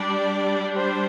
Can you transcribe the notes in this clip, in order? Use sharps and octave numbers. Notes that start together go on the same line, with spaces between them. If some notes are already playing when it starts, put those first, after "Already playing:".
Already playing: G3 D4 D5
C5